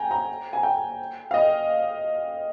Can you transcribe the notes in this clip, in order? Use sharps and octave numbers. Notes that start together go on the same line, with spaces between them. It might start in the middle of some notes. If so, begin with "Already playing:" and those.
Already playing: G5 G#5 A#5
A#5
G#5
G5
F5
D#5